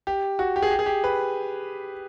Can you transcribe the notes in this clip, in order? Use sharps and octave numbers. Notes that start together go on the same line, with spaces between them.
G4
F#4
G4
G#4
G4
G#4
G4
B4